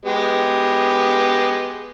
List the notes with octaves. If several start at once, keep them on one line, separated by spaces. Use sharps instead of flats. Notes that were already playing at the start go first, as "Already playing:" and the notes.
G#3 B3 G4